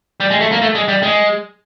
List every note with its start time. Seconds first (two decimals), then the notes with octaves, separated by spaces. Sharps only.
0.20 G3
0.30 G#3
0.41 A3
0.52 A#3
0.61 A3
0.75 G#3
0.88 G3
1.03 G#3